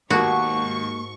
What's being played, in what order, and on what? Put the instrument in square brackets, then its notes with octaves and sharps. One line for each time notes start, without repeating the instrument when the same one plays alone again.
[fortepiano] D#2 B2 [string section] G#2 C#6 [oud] A#3 [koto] F#4